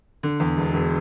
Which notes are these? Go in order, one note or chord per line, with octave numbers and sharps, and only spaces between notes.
D3
E2
E1
E1